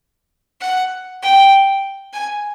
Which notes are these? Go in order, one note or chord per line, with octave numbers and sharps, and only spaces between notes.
F#5
G5
G#5